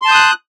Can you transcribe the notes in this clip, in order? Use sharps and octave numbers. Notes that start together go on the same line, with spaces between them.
A5 C6 D#6 F#6 G6